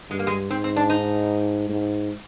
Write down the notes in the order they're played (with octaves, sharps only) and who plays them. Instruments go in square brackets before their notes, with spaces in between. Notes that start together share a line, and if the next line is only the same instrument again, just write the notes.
[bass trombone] G2 [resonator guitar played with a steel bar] G#3
[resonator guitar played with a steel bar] A#3
G#3
[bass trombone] G#2 [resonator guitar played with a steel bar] C4
[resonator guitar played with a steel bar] C4
D4
D#4
[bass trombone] G#2